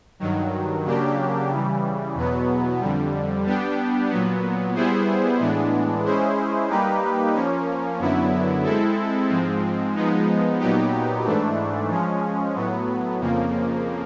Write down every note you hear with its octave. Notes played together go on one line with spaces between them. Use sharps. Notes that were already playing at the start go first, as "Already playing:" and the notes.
G2 D#3 F#3
C#3 F#3 A#3 D4 G4
C#3 E3 G3
E2 B2 F#3 B3
F2 D3 G3
G3 B3 D4 G4
A#2 F#3 B3
G3 B3 E4 G#4 C5
A2 E3 G#3 B3 D4
G#3 C#4 E4 G#4 C5
G3 A#3 D#4 G4 B4
F3 A#3 C#4
F#2 D3 F#3 B3 E4
G#3 C4 E4 A4
G#2 F3 G#3 C4
F3 G#3 B3 D#4
A#2 F#3 B3 D#4 G4
G#2 E3 A3 D4
F3 G#3 C#4
A2 F#3 B3
F2 C#3 F3 A#3